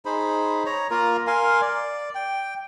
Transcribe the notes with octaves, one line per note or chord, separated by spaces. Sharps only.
D#4 G#4 C5 B5
C#5 A#5
A#3 F4 A#4 A#5
A#4 F5 G#5 C6
D5
G5